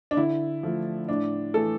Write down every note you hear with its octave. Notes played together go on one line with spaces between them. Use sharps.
D4
D3 E4
F3 A3
A2 D4
E3 A3 A4